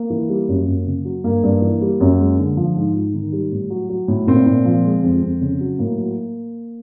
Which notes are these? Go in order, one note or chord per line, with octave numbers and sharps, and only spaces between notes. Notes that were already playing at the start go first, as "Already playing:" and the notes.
Already playing: A#3
E3
G3
F#2
F#2
C#3
F#3
G2 A#3
G2
E3
G3
F#2
G#3
D3
F3
G#2
G#2
D#3
G3
A2
F#3
F#3
A2
A#2 C4
A#2
F3
G#3
F2
F2
C#3
F#3
A2 A#3
F#3